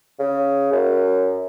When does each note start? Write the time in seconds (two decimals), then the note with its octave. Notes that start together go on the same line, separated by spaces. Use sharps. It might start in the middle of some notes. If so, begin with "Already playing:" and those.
0.19 C#3
0.72 F#2